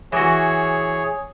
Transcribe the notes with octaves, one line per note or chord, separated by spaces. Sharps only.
E3 F#4 G#4 C#5